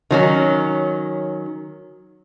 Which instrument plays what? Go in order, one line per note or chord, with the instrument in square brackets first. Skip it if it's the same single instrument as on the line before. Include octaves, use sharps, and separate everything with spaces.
[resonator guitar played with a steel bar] D#3 F#3 C#4